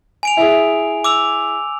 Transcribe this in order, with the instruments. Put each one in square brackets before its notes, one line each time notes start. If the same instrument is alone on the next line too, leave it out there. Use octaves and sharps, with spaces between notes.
[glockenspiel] G#5 D7 F7
[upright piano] E4 G#4
[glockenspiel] D6 E6 F7